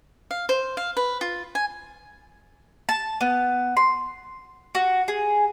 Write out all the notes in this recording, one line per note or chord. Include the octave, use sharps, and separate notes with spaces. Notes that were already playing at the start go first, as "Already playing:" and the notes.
F5
C5
F5
B4
F4
G#5
A5
B3
C6
F#4
G#4